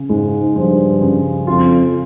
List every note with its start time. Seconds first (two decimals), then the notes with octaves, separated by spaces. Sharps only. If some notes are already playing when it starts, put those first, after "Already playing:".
Already playing: C#3
0.09 G#2 G#3
0.56 G2 F3
1.01 C#3
1.47 F2 F4